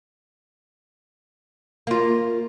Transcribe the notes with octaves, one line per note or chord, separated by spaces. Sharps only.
A#3 F4